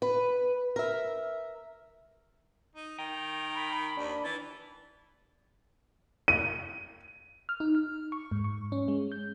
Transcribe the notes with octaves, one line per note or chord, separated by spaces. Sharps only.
B4
A#4 E5
D#4
D#3 G5 A#5
B5
D#2 D4
E3 A6
D#7
F6
D#4
F6
C#6
G#2
C#6
C#4
G#3
G6